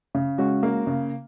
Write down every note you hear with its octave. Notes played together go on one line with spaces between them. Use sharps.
C#3
G#3 C#4 F#4
A#3
C#3